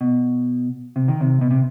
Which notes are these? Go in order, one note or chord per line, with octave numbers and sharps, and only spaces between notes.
B2
C3
D#3
C3
B2
C3